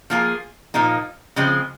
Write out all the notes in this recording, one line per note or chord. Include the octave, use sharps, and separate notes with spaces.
F3 A#3 F4 G#4
A#2 F3 A#3 D#4
C#3 F3 G#3 C4